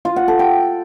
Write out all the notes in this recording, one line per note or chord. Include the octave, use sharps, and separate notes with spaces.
F4
F#5
A4
G5